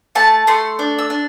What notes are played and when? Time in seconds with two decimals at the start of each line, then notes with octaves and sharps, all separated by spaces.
0.15 A3 A5
0.47 A3 C6
0.79 D4
0.99 E6
1.10 D4